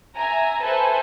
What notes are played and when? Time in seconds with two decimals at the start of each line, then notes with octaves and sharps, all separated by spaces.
0.16 E5 G#5 A#5
0.61 A4 B4 C5 E5 G#5